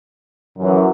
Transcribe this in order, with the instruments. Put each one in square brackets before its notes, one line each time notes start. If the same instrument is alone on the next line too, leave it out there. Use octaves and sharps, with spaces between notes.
[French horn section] F#2 E3